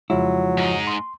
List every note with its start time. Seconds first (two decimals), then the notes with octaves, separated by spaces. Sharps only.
0.10 F2 C#3 F3 F#3 G#3 E4
0.58 G#2 D#4
0.87 C6